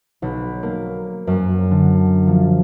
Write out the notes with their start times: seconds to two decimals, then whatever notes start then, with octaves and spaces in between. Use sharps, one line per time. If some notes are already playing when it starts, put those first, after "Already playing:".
0.22 B1
0.63 A#3
1.27 F#2
1.71 D3
2.27 F3